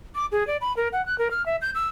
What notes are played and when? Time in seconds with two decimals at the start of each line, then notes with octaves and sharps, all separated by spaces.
0.15 D6
0.32 G#4
0.47 D5
0.61 B5
0.77 A#4
0.93 F#5
1.06 F#6
1.18 A#4
1.31 F6
1.46 E5
1.62 G6
1.75 E6